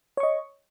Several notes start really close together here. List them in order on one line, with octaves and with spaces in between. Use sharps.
C#5 C#6 D#5